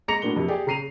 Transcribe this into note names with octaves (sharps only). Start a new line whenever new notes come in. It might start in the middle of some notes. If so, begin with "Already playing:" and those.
G#3 A#5 A#6 C#7 F7
A2 D4 F#4 A#4 G7
F2 C3
G4 G#4 D5
C#3 A#5 C7 D#7 F7